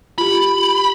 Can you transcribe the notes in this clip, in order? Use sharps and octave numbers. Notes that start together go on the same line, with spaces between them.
F4 G4 B5